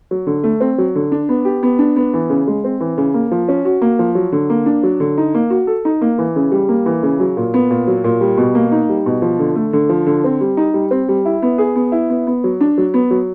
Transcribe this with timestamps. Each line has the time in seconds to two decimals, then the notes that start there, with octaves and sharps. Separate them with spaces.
0.11 F#3
0.27 D3
0.44 A3
0.61 C4
0.78 F#3
0.95 D3
1.12 D4
1.29 B3
1.45 G4
1.63 B3
1.79 D4
1.96 B3
2.14 E3
2.30 C#3
2.47 G#3
2.64 C4
2.80 E3
2.98 C#3
3.14 A#3
3.31 F3
3.49 C#4
3.65 F#4
3.82 A#3
3.99 F3
4.15 F#3
4.32 D3
4.50 A#3
4.66 D4
4.83 F#3
5.00 D3
5.18 D#4
5.35 A#3
5.50 F#4
5.67 A4
5.85 D#4
6.01 A#3
6.18 E3
6.36 C#3
6.52 G3
6.69 A#3
6.86 E3
7.03 C#3
7.20 F#3
7.37 A#2
7.54 B3
7.70 A#2
7.87 F#3
8.04 A#2
8.21 G3
8.37 B2
8.55 A#3
8.72 D#4
8.89 G3
9.06 B2
9.22 F3
9.39 D3
9.56 A3
9.73 D3
9.89 F3
10.07 D3
10.24 C4
10.41 G3
10.57 D#4
10.74 G3
10.91 C4
11.09 G3
11.25 E4
11.42 B3
11.58 G#4
11.76 B3
11.92 E4
12.10 B3
12.27 B3
12.44 F#3
12.61 D4
12.78 F#3
12.94 B3
13.11 F#3